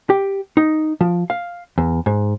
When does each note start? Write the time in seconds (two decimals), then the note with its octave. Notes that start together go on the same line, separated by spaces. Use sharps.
0.10 G4
0.57 D#4
1.01 F3
1.30 F5
1.78 E2
2.06 G#2